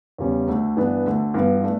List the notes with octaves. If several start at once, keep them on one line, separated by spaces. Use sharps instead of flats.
E2 C#3 G3 C#4
D2 D3 A3
G2 E3 B3 D4
D2 D3 A3
G1 G2 E3 B3
A3 D4